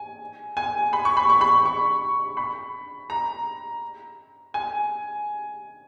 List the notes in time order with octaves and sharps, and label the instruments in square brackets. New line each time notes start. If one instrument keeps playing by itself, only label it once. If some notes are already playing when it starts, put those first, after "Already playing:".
Already playing: [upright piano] G#5
G#5
B5
C#6
B5
C#6
B5
C#6
B5
A#5
G#5